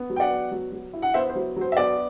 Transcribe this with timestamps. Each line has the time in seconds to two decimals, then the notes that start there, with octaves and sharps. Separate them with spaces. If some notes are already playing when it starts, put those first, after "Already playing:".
Already playing: B3
0.10 F#3
0.16 G5
0.20 D5 F#5
0.31 B3
0.51 F#3
0.72 F#3
0.93 E4
1.02 F#5
1.14 B3 C5 E5
1.30 C5
1.35 F#3
1.56 F#3 C5
1.72 E5
1.77 B3 D5